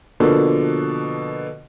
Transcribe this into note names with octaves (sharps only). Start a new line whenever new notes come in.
B2 D3 F3 A#3 D4 A4